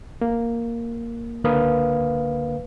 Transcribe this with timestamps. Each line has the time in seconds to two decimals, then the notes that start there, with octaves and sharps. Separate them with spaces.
0.21 A#3
1.44 C#2 D3 A#3 B4 F5 D#6